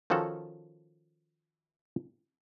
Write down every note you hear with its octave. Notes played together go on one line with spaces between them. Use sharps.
D#3 F3 C#4 F#4 A4